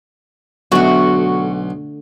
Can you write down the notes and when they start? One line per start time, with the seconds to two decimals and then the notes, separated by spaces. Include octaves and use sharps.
0.72 B1 D3 A3 F#4